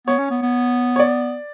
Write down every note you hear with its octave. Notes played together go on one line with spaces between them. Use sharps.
B3 C#5
C#4
B3
B3
C#5
D5